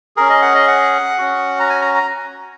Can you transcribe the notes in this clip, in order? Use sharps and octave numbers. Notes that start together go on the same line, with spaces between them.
C#4 G#4 A#4
D#5
F#5
D#5
F#5
C#4 F#4
A#5
G#5
A#5
A#5